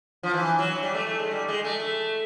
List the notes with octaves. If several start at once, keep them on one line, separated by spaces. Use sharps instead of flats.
F3
E3
F#3
G3
A3
A3
G#3
G3
G#3
A3
A3